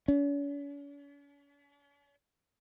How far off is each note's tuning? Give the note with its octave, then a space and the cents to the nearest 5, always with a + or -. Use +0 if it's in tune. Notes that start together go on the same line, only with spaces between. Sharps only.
C#4 +45